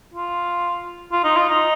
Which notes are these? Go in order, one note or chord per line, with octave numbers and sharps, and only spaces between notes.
F4
F4
D#4
F4
D#4